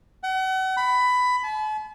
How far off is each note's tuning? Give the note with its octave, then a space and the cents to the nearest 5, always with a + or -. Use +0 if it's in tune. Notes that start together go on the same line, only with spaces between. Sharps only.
F#5 +35
B5 +15
A5 -40